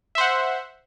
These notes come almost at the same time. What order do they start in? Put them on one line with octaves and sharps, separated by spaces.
E5 C5 F#5